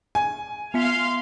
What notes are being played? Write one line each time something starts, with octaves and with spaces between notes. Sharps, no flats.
G#5
B3 E5 F5 C6 F6 B6